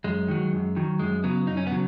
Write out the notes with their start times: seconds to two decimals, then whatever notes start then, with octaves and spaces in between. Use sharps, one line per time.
0.04 F#2 G#3
0.28 D#3 F#3
0.53 F#2
0.76 D#3 F#3
0.99 F#2 G#3
1.24 C#3 F#3 B3
1.47 F#2 D#4
1.57 C#4
1.67 B3
1.71 C#3 F#3